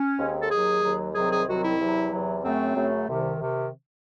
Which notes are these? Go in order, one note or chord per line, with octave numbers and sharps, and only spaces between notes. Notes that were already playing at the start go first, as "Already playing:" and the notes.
Already playing: C#4
D#2 D#3 G#3 C4
A4
D#2 D#3 F#3 G#4
D#2 D#3 F#3
C2 C3 D#3 F#3 C4 G#4
G#4
C2 C3 D#3 F#3 C4 F#4
E4
E2 C3 F#3
E2 C3 F#3
F#2 C#3 F#3 A3 C4
F#2 C#3 F#3 A3
C2 C3 D#3
C3 D#3